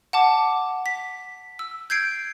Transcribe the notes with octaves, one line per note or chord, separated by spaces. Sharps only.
F#5 A5 D6
B6
E6
G6 G#6 C7 D7